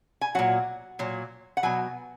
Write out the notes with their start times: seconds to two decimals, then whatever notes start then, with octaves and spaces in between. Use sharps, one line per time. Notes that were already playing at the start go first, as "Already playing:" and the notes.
0.21 G#5
0.35 A#2 F#3 F#5
0.99 A#2 F#3
1.57 F#5
1.63 B2 F#3 G#5